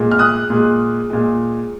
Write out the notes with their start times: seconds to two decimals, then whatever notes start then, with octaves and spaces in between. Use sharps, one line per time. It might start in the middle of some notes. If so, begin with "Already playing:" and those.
Already playing: A#2 G#3
0.11 F6
0.19 D#6 F#6
0.50 A#2 G#3
1.10 A#2 G#3